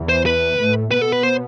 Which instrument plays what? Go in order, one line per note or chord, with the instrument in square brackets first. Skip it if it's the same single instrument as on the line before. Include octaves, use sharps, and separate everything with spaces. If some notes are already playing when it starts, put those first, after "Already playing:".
Already playing: [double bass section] E2 E3
[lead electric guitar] C5
B4
[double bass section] A2 A3
[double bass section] B2 B3 [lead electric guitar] B4
[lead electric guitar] A4
B4
C5